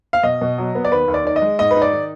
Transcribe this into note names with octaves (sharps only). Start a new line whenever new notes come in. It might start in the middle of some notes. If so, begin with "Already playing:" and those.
F5
B2 D#5
B2
F#3
B3
D5
D#2 B4
D#2
D5
D#3 D5
D#5
G#3
G#2 D#5
B4
D#4
D5
D#3